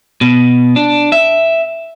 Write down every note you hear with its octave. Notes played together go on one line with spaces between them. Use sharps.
B2
D4
E5